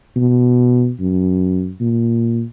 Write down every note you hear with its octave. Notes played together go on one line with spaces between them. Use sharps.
B2
F#2
A#2